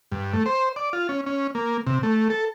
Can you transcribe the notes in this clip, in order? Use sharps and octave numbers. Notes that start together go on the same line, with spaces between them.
G2
A3
C5
D5
F4
C#4
C#4
A#3
C3
A3
A4